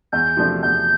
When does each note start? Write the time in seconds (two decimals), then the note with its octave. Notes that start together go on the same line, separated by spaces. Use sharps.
0.12 E2 G6
0.37 C3 F3 A3 D4
0.62 E2 G6